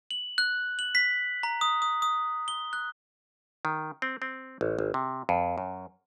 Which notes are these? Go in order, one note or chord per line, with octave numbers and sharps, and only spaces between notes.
F#7
F#6
F#7
B6
A#5
D#6
D#6
D#6
G7
F#6
D#3
C4
C4
A1
G#1
C3
F2
F#2